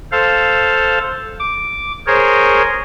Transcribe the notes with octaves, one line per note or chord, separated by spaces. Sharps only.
A4 C5 F5
D6
G#4 A#4 C5 C#5